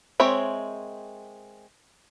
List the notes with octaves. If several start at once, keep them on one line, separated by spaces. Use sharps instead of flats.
G#3 C4 A#4 C#5 E5